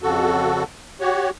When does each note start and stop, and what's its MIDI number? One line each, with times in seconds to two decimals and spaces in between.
0.02 0.63 41
0.02 0.63 49
0.02 0.63 66
0.02 0.63 69
1.01 1.30 66
1.01 1.30 67
1.01 1.30 73